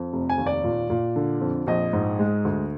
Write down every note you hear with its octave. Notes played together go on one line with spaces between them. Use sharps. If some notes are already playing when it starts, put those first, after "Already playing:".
Already playing: F2
F1
G#5
D#2
D5
A#2
A#2
D3
F2
A#1 D#5
G#2
G#3
D2